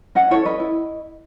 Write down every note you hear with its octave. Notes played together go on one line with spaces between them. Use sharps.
C#4 D#5 F#5
E4 A4 C#5 E5
C#4 B4 D#5
E4